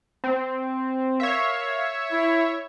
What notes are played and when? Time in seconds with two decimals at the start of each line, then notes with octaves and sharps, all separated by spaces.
0.24 C4
1.20 A#4 C#5 E5 F5
2.12 E4